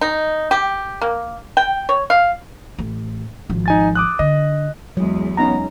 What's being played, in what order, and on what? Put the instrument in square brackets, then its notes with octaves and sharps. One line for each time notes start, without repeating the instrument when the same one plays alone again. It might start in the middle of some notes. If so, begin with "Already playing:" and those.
[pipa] D#4
G4
A#3
G5
C#5
F5
[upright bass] A1
G#1 F3
[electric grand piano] D#4 G#5 A6
D6 D#6 F#6
[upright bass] D3 [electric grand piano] D#5
[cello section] E2 G#3 [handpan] F#3
[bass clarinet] B3 [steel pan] C#4 D#4 A#5